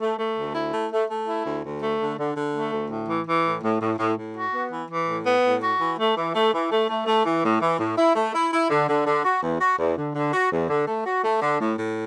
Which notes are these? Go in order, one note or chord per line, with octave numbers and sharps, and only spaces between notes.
A3
A3
D2
E4
A3
A3
A3
E4
D2
D2
A3
D3
D3
D3
A3
D2
A2
E3
E3
A2
A2
A2
A2
A2
F#4
B3
E3
E3
A2
B3
A2
F#4
E3
A3
E3
A3
E3
A3
A3
A3
E3
A2
E3
A2
E4
A3
E4
E4
D3
D3
D3
F#4
E2
F#4
E2
D3
D3
F#4
E2
D3
A3
F#4
A3
D3
A2
A2